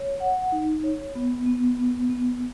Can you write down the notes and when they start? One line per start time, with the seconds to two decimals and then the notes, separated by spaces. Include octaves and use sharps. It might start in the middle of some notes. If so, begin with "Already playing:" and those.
Already playing: C#5
0.20 F#5
0.52 D#4
0.84 C#5
1.15 B3
1.46 B3
1.79 B3
2.10 B3